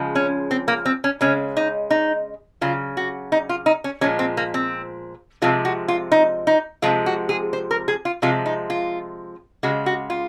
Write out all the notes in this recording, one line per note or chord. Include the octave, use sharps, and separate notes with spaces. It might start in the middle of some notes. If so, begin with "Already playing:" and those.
Already playing: C#3 F3 G#3
C#4
C4
A#3
C4
C#4
C#3 G#3 C#4
D#4
D#4
C#3 F#3 F4
F#4
D#4
F4
D#4
C#4
A#2 F3 G#3 C#4
C4
A#3
C4
C3 F3 G#3 F4
F#4
F4
D#4
D#4
C3 F3 G#3 F4
F#4
G#4
C5
A#4
G#4
F4
C3 F3 G#3 F4
D#4
F4
C#3 G#3 F#4
F#4
F4